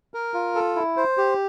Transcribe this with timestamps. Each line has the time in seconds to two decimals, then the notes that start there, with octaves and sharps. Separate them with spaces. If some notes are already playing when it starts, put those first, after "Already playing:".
0.14 A#4
0.34 F4
0.55 A4
0.76 E4
0.97 C5
1.17 G4